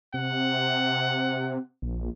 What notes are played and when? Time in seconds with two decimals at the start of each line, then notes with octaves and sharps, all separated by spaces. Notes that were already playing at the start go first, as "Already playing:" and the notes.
0.14 C3 F#5
1.82 A#1